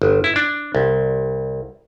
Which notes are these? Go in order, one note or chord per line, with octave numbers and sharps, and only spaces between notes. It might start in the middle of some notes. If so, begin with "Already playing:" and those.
G1
E4
D4
C2